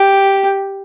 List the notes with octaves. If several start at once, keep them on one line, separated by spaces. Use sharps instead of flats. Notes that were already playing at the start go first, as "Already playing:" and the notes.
Already playing: G4